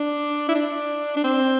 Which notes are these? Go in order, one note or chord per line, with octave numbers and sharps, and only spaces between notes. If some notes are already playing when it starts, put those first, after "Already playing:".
Already playing: D4
E4
D4
D4
C4